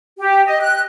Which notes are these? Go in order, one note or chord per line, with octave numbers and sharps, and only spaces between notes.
G4
D#5
F#6